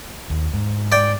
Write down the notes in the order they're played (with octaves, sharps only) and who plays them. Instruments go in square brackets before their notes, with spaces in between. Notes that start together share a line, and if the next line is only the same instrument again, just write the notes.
[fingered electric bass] D#2
G#2
[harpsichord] D5 G5